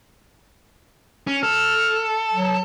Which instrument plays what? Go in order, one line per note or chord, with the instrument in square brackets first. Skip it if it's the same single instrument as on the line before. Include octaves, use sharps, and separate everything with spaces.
[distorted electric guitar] C#4
[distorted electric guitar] A4 [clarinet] F6
[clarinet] F#3